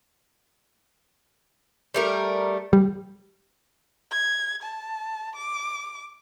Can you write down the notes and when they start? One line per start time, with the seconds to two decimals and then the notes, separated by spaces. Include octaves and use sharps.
1.94 G3 A3 A#4
2.73 G3
4.11 G#6
4.63 A5
5.36 D6